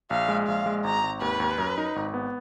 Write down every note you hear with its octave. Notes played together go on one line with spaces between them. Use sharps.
A#1 F5
G#3
A#1 F5
G#3
G#1 A#5
G#1
D#2 B4
D#2
F#2
D#4
G#1
B3